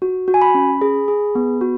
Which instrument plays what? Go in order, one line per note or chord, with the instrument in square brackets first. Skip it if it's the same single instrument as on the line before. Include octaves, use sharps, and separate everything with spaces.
[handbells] F#4
F#4
G#5
B5
C#4
G#4
G#4
B3
F#4